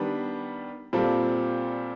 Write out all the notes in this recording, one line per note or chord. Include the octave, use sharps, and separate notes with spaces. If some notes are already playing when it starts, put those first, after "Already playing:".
Already playing: D#3 G3 B3 D4
A#2 G3 C4 F4 A4